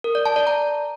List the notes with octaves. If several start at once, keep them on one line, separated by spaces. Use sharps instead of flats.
A#4
D5
A5
D5
A#5